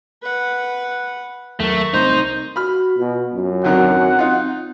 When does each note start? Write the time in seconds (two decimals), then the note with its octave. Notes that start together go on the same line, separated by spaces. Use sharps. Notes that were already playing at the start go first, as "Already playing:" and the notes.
0.23 B4 F#5
1.60 D#2 F#3 A3 A#4 C#6
1.94 C2 A3 C4 D#4 C5
2.56 F#4 B5 F6
2.98 B2 F4
3.34 F#2
3.64 D3 D#3 F#3 C4 F#5
4.19 D#4 F4